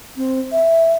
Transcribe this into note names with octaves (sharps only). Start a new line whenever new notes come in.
C4
E5